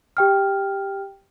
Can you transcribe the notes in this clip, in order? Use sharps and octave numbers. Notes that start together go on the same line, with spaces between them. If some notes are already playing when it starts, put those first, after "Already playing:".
G4 G5 F6